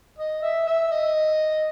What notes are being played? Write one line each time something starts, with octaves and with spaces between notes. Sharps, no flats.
D#5
E5
E5
D#5